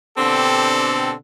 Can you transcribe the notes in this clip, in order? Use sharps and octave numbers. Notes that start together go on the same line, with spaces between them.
B2 D3 C4 D4 G4 A4